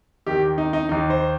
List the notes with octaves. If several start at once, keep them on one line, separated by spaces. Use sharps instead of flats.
D#2 D#3 G4
D#4
D#4
D#2 D#3 D#4
C5